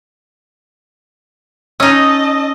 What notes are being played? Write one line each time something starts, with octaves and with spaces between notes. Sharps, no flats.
C#4 D#4 D#5 A5 E6